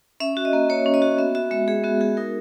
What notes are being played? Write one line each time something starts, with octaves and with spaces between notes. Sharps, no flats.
C#4 E5
F#4
D#5
A#3
A#3 C#5
C#4
D#5
F#4
B3 E5
F#4 E5
G#3 E5
G#3 G#4
B3 F#4
F#4 G#4
D#4 A#4